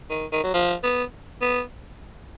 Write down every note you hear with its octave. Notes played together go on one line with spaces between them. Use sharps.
D#3
D#3
F#3
F3
B3
B3